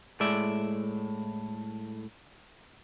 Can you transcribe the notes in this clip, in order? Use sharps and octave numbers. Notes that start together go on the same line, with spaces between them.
A2 G#3 D5 E5